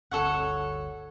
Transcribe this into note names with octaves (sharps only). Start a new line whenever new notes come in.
G1 D2 A4 C#5 F#5